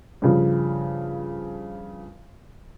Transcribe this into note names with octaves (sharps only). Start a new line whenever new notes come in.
G2 C#3 F3